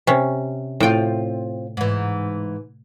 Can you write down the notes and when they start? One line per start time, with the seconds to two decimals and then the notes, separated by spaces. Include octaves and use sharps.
0.07 C3 C#4
0.80 A2 C4 F4 G5
1.77 G#2 E3